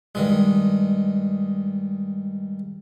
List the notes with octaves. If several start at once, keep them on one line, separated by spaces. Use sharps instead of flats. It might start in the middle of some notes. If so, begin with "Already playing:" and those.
G2 D#3 G#3